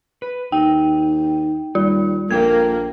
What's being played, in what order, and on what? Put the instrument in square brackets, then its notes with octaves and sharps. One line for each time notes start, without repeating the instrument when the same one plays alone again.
[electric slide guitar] B4
[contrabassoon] D#2 [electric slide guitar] D#4 [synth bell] G5
[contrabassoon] D#2 [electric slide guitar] G3 [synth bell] F4
[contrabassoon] A#1 [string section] A#3 [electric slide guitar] F4 A4 G5 [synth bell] G#6